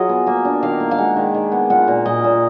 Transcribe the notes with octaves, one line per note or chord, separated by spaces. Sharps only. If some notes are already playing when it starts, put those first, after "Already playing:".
Already playing: F#3 F4 G#4 D#5
B3
A#3 F5
D4
D#3 F5
A#3
F5
G#3 F#5
D#3
D#3
B3
F4 F#5
A#2
A#2 D#5
A#2